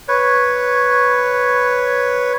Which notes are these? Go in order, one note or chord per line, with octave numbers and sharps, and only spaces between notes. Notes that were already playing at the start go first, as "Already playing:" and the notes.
B4 C#5